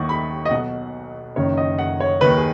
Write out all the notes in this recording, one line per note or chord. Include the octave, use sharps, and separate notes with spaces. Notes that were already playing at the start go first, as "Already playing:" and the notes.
Already playing: D#2 D#3 F#5 C#6
B5
D#5
B1 B2 F#5
F#1 F#2 D#3 C#5
D#5
F#5
C#5
D#2 D#3 B4
G#4